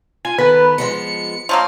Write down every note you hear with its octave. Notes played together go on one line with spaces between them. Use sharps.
F4 G#5
D#3 B3 A4 B4
F3 G#3 B3 C#7
F3 F#3 A#3